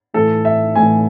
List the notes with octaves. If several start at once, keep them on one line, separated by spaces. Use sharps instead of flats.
A2 E3 A4
E5
A2 E3 G#5